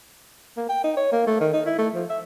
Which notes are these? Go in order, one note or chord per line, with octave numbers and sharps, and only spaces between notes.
A#3
G5
D#4
C#5
A#3
A3
D#3
D#4
E4
A3
F3
E5